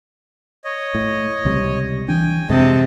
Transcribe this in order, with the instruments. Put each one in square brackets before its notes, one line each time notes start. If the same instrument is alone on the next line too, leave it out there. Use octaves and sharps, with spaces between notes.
[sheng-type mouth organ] C#5 D#5
[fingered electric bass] A2
C#2 C3 G3
[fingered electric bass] E3 D4 [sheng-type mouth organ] G5 G#5
[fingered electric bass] F2 G#3 [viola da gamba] C3 [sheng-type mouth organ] D#5 A5